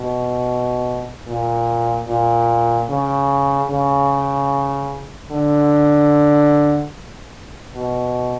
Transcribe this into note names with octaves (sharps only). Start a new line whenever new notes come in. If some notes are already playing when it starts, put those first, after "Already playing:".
Already playing: B2
A#2
A#2
C#3
C#3
D3
B2